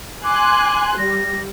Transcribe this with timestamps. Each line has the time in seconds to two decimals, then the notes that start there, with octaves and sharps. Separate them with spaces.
0.24 G#5 C6 D6 F#6
0.98 G3 A#6